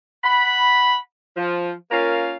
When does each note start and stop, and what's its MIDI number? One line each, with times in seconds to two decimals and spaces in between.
0.23 0.96 78
0.23 0.96 83
1.37 1.72 53
1.91 2.36 58
1.91 2.36 61
1.91 2.36 65
1.91 2.36 70
1.91 2.36 77